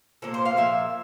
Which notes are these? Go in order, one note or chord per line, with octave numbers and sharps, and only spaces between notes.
A#2 F3 A#3 A4
C5
F5
A#2 F3 E5